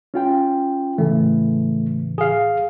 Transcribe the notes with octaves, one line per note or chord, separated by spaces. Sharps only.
C#4 F4 G5
A2 C#3 E3 A3
G#4 F5